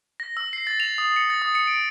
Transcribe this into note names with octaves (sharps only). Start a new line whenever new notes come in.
A#6
E6
C7
A6
F7
D#6
C#7
A6
D#6
C#7
D7